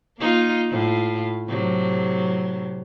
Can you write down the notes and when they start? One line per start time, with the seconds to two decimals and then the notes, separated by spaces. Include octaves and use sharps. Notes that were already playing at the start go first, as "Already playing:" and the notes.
0.18 A#3 D#4 F4
0.70 A2 F4
1.49 A2 C3 F#3